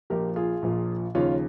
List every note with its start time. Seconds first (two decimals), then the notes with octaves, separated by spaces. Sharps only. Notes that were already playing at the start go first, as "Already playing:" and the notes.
0.10 A#1 A#2 F3 G4 A#4
0.36 F4 G#4
0.62 A#1 A#2 F3
1.15 D#2 C#3 F3 C#4 F4